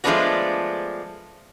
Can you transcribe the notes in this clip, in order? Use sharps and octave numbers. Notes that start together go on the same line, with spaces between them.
F3 G#3 A3 B3 D4 F#4